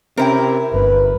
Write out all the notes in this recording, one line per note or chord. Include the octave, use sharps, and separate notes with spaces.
C3 C4 C#4 E4 A#4 G5
G1 B4